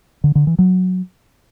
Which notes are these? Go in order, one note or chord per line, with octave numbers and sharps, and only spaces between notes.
D3
D3
E3
F#3